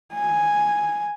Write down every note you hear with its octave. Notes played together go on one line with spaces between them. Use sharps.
G#5